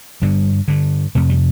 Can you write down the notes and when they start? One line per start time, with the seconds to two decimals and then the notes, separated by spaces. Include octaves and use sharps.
0.22 G2 D3 G3
0.68 G2 D3
1.15 F2 C3 A3
1.30 G3